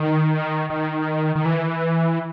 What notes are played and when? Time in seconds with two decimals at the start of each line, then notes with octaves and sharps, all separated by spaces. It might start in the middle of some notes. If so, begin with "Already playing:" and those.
Already playing: D#3
0.70 D#3
1.36 D#3
1.45 E3